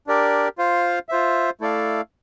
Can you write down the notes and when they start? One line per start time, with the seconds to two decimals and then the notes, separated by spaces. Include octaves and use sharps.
0.07 D4 G4 A#4 D5
0.58 F4 C5 F5
1.09 F4 C5 E5
1.61 A3 E4 A4 D5 F5